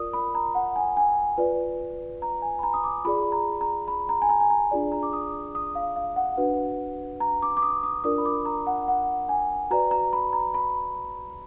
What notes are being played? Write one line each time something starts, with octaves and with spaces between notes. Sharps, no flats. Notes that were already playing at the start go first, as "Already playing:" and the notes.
Already playing: F4 A#4 D5 D#6
B5
A#5
F#5
G#5
G#5
F4 B4 D5
A#5
G#5
B5
A#5
D#6
D6
F4 G#4 D5 B5
A#5
A#5
B5
A#5
G#5
A#5
G#5
A#5
D4 F4 G#4 D5
A#5
D6
D#6
D#6
F5
F5
F#5
D4 F#4 B4
A#5
D6
D6
D#6
D#6
D4 F4 A#4 D5 D#6
B5
D6
A#5
F#5
F#5
G#5
F#4 B4 D5 A#5
A#5
B5
A#5
B5